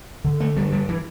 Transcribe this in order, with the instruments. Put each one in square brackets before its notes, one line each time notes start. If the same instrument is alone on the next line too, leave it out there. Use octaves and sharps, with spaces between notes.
[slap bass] D3
A3
G2 G3
G3
E3